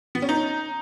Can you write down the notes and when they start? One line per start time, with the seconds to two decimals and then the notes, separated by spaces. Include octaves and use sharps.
0.15 B3
0.22 C#4
0.29 D#4